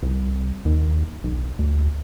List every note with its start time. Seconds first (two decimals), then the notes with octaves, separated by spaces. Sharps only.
0.03 C2
0.65 D#2
1.24 B1
1.59 D2